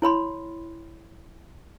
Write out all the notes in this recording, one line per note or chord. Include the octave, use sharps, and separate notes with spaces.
E4 C#5 B5 C6